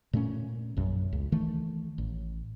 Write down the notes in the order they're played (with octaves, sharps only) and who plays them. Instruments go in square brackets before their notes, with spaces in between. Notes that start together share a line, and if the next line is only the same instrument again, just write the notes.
[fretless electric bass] A#2 A3 B3 C#4
A#1 F#2 B2
C#2
D#3 E3 A3
A1